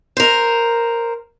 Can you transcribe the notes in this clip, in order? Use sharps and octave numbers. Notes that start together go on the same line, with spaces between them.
A#4 C5